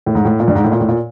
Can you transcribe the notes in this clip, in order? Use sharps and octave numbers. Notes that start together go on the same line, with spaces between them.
A2
G#2
A2
A#2
G2
G#2
A2
A#2
A2
A#2